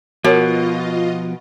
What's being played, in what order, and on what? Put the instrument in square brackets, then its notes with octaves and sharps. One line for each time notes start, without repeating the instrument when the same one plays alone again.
[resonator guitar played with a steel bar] B2 [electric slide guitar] F3 B3 [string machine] F4 D#5 [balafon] F#4 A#4 C#5